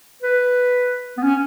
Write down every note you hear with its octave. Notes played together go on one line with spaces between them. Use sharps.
B4
B3
C#4